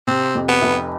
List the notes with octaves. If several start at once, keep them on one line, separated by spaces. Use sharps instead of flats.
C3 C4
F2
B3
F1